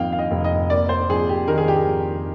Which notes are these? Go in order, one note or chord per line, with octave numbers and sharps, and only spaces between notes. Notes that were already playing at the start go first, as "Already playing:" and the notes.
Already playing: F2 D#3 F5 G5
F5
D#5
F1
D#5
A#3 D5
C5
F2 G#4
G4
D#3 A#4
G#4
G4
G#4
F2